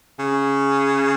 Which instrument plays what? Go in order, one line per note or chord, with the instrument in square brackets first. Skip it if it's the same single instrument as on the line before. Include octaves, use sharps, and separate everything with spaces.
[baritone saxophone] C#3